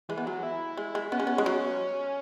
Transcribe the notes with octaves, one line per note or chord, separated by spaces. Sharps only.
E3 G#3
B3
F#3 G#3
E4
G#3
G#3
B3 C#4
G#3
B3
G#3
F#3